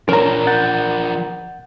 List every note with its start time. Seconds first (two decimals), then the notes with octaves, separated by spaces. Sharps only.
0.09 F3 C#4 D4 A#4 A#5
0.47 F#5 G6 A6